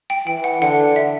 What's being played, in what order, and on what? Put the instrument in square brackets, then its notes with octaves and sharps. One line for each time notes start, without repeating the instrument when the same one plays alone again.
[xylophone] G5
[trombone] E3 [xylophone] G5
[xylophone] F#5
[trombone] D3 [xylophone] F#5
[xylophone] E5